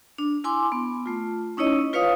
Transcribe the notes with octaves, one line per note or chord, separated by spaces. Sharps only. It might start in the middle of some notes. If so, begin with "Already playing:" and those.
D4
E4 G#5 C6 D6
B3
A3 F4
C#4 D#4 E4 C#5 D#5
F4 B4 C#5 F5 D#6